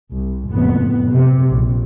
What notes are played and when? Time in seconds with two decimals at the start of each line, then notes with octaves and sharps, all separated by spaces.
0.11 C2
0.49 F#1 F2 A2 B3
1.11 C3
1.49 A#1